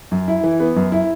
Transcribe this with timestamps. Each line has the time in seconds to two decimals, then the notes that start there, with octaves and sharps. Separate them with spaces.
0.11 F#2
0.28 E4
0.44 E3
0.60 B3
0.76 F#2
0.92 E4